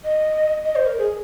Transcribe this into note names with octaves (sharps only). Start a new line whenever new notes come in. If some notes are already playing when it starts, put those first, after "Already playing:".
D#5
D#5
C5
A#4
G#4